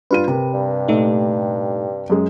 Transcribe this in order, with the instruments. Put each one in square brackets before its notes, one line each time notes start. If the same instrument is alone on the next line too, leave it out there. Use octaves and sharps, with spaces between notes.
[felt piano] G2 F4 D#7 [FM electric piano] B4
[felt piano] C3 A#4
[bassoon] G2
[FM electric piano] A#2 A3 D#4
[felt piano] F#2 G#3